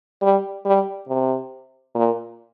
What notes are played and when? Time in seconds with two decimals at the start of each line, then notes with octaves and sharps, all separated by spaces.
0.22 G3
0.65 G3
1.08 C3
1.95 A#2